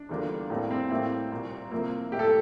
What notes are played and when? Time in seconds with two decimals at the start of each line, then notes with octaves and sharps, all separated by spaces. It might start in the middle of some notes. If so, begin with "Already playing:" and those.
Already playing: D4
0.09 E2 D3 G3 A#3 F4
0.50 A2 G3 A#3 C4
0.71 C4
0.90 A2 G3 A#3 C4 E4
1.31 C2 A#2 G3
1.71 C3 F3 A#3 C4 E4
2.12 A2 G3 A#3 E4 G4
2.19 A4